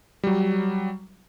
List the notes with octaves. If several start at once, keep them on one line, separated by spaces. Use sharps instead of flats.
F#3 G3